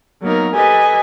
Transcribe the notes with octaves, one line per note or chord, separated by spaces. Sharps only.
F#3 A#3 B3 D#4 A#4
G4 A4 B4 D#5 G#5